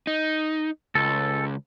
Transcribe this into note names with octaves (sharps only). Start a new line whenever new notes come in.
D#4
C#2 A4